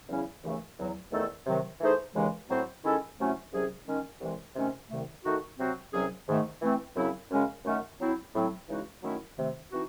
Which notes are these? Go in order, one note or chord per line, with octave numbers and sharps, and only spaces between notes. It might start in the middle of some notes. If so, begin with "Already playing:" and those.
E2 C#3 F#3 C#4 E4
D#2 C#3 E3 A3
E2 D#3 F#3
E2 D#3 A3 D#4 A4
C3 D#3 F#3
E3 A3 D#4 G#4 C5
D#2 C#3 E3 G#3
A2 F#3 C4 F#4 C5
D#3 G#3 C#4 E4 A4
C3 F#3 A3 C#4 E4
C2 C3 F#3 C#4 G#4
D#3 G#3 C#4
C2 C3 E3 G#3
C3 D#3 A3 C#4
C2 C3 D#3 A3
D#3 A3 D#4 F#4
C3 F#3 C4 F#4
C2 C3 F#3 C#4 G#4
G#2 D#3 A3
E3 A3 C4
F#2 C#3 F#3 C4 E4
F#2 C#3 G#3 C#4
F#2 D#3 A3 C#4 F#4
F#3 C4 E4
A2 F#3 C4
C#3 E3 G#3 D#4 F#4
D#3 F#3 A3 C#4 E4
C3 D#3 A3
E3 C4 D#4 F#4